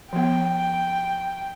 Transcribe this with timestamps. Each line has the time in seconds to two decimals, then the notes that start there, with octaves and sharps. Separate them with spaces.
0.13 F3 B3 G5